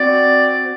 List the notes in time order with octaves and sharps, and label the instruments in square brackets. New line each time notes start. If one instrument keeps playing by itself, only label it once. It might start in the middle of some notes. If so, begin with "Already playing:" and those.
Already playing: [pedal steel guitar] C4 F#4 [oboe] D5